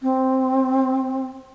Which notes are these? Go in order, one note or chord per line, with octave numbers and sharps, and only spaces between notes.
C4